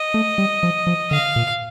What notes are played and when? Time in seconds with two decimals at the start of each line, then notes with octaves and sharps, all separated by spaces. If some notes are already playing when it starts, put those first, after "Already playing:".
Already playing: D#5
0.14 A3
0.38 G3
0.63 F3
0.87 F3
1.11 D3 F5
1.36 A#2